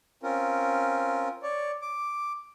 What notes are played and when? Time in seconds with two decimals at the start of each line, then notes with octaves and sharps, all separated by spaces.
0.23 C4 C#4 F4 A#4
1.43 C#5 D5
1.82 D6